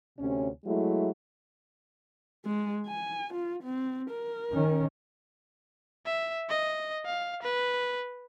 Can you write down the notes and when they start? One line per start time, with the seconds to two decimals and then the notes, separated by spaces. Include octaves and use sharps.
0.19 D2 C3 C#4
0.65 F#3 G#3 A3 E4
2.46 G#3
2.87 G#5
3.34 F4
3.63 C4
4.10 A#4
4.53 D#3 C#4
6.06 E5
6.49 D#5
7.06 F5
7.42 B4